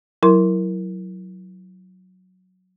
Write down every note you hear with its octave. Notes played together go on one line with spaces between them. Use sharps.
F#3 E4 A#4 C6